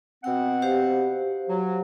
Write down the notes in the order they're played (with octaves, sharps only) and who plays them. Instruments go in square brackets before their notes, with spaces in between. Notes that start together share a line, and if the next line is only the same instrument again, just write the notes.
[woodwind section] B2 C4 F#5 [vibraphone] G5
[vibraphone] G4 C5 F5
[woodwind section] F#3